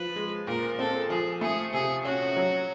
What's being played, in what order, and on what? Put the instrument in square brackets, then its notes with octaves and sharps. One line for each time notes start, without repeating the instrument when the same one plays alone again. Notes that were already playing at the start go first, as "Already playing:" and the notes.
Already playing: [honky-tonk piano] F3 [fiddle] B4
[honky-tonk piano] G#3
[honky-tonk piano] A#2 [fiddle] A#4
[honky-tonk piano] C4 [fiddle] A4
[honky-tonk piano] F3 [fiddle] G#4
[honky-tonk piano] A3 [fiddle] G#4
[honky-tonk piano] C3 [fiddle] G#4
[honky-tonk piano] C#4 [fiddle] F#4
[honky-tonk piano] F#3